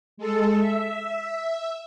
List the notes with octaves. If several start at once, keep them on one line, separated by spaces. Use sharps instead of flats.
G#3 A4
E5